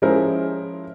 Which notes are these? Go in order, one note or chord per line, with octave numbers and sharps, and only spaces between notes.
F3 G#3 C#4 E4 A#4 C5